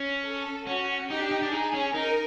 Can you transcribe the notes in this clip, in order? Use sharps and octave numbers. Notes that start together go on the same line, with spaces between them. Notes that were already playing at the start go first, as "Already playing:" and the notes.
Already playing: C#4
A4
C#4 F#4
D#4 G4
D4
D#4
D4
D#4 G#4
C#4
D#4 A#4